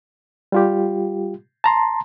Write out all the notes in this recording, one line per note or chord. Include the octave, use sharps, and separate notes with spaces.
G3 F4 G4
A5 A#5 C6